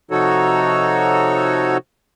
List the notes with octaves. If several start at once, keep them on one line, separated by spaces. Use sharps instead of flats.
C3 F3 D#4 F#4 A4 C#5